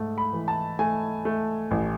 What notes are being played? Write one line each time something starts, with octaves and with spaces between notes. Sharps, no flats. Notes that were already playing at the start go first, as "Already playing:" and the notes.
Already playing: G#2 A3
B5
E3
A5
A3 G#5
A3
A1